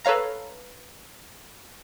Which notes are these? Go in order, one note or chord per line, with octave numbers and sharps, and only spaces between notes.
A4 B4 C#5 F5 A#5